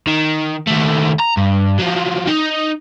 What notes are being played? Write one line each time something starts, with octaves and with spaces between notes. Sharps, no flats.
D#3
D#2 A3
A#5
G2
F3 F#3
D#4